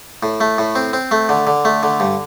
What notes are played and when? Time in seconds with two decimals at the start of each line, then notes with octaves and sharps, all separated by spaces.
0.23 A2
0.40 A3
0.58 A2
0.75 C4
0.93 C4
1.11 A3
1.29 D3
1.47 D3
1.65 A3
1.83 D3
2.00 G2